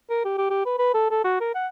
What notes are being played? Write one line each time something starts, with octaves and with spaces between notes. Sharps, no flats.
A#4
G4
G4
G4
B4
B4
A4
A4
F#4
A#4
F#5